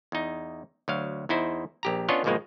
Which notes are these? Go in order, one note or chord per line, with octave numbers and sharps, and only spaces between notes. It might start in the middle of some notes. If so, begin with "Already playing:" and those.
E2 D#4
D2 F#3 F5
E2 D#4 E4 C5
A#1 G4 A#5
B3 C#4 D4 F4 C#5 D#5
G#1 D#2 B2 F3 G#3 A#3